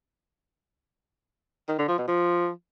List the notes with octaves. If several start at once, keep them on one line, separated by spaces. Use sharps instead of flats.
D#3
D3
F3
B2
F3